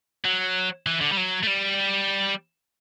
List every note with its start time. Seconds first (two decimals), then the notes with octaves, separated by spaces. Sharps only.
0.25 F#3
0.87 E3
1.01 D3
1.12 G3
1.17 F#3
1.43 A3
1.47 G3